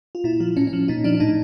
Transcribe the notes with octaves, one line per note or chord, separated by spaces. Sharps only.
F4
A#2 E4
F3 F4
A2 C#4
C#4
F3
A#2 D#4
F3 D4
D4
A2 D#4